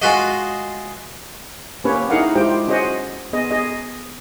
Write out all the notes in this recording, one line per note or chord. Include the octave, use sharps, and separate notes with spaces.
G#3 F4 F#4 D#5
A#3 C#4 G4 B4 C#5
D#4 E4 G#4 A#4 F5 F#5
G#3 E4 F4 G4 C5 G5
C#4 F#4 G#4 C5 D#5 F#5
B3 G#4 D#5
G#4 D#5